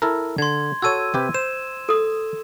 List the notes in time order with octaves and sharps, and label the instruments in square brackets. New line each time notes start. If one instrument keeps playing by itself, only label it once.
[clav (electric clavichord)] E4 A4 A#4
[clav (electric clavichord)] D3 [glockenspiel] C6 G#6
[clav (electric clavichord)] F#4 A4 C#5 [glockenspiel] E6 G#6 D#7
[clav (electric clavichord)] C3 G4 B4
[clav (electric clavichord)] C5 [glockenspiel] E7
[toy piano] A4 D#6